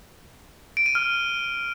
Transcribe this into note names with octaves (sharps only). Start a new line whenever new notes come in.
D7
D#7
F6